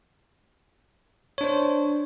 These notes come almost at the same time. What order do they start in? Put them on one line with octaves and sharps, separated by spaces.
C#5 D4 C5